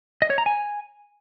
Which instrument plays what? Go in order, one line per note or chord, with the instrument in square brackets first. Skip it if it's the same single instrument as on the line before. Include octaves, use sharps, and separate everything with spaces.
[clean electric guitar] D#5
C#5
A#5
G#5